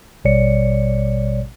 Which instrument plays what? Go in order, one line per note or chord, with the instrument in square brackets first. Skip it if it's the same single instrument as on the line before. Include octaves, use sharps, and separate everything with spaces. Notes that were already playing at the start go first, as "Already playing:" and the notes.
[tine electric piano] A1 B2 G3 C#5 D5 C#7